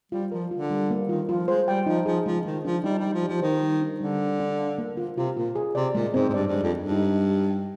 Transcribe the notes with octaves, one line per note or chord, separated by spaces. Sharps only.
G3 F4
F3 A#4
D3 F4
G3
A#3
D#3 F4
F3 F4
G#3 C5
G3 G5
F3 D#4
F3 G#4
F3 G#3
D#3 G#3
F3 D4
G3 D#4
G3 D#4
F3
G4
F3
D#3 C5
G3
D4
D3 G3
G3
D4
F5
A#3
F4
C3 F4
A#2 F4
G#4
C3 D5
A#2 G#3
G#2 C4
G#2
G2 D5
G2
G#3
F2
D4
G2
D#4
D#4
G4
G5